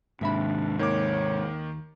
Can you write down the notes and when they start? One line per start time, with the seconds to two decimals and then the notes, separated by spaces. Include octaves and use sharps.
0.21 D#2 G#2 C3 D4 E5 B5
0.79 D#3 A#3 C#5 D6